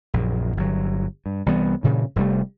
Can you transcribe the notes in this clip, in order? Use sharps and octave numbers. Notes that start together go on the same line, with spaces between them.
A#1 F#2
G1 F#3
G2
C2 E3 G3 B3
G2 A#2 C#3 E3
F1 C3 G3 A3